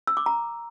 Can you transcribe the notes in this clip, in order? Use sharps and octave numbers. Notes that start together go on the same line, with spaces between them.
E6
D6
A#5